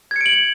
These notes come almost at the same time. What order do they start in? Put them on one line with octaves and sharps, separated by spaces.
G#6 C#7 D7 F#7